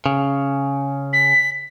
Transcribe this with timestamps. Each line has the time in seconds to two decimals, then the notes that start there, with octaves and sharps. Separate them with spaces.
0.06 C#3
1.13 B6